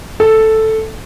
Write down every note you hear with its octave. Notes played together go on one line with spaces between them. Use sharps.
A4